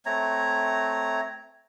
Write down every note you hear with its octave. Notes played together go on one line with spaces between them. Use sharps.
A3 C4 C#5 A#5